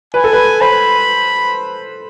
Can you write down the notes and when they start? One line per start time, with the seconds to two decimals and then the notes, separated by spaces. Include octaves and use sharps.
0.14 B4 G#5
0.24 A4
0.33 B4
0.61 C5 B5